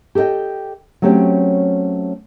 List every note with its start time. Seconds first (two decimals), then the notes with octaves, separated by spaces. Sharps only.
0.15 G4 A4 B4 D#5 G5
1.02 F#3 A3 C4 C#4 G4